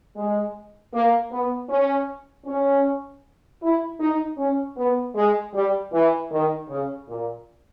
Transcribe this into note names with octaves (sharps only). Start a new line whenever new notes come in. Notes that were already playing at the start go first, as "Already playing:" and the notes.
G#3
A#3
B3
C#4
C#4
E4
D#4
C#4
B3
G#3
G3
E3
D#3
C#3
A#2